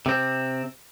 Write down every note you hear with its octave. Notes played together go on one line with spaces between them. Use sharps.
C3 C4